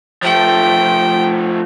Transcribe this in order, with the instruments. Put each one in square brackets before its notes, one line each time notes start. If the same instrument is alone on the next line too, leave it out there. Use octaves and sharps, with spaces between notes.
[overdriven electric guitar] F3 A3 [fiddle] G5